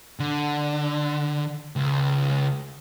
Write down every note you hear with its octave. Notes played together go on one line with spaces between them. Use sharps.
D3
C#2